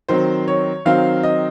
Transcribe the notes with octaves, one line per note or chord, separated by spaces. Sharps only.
D#3 F#3 C4 C5
C#5
D#3 F#3 C4 F5
D#5